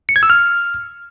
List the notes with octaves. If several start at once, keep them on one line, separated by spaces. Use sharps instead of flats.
C#7
G#6
E6
F6